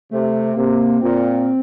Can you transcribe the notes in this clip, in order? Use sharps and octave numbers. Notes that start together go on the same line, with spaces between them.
C3 A3
C3 A#3
A#2 C4